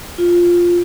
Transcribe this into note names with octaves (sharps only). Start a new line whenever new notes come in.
F4